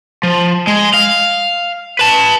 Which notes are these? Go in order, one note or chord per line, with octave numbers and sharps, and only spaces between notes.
F3
G#3
F5
B4 A5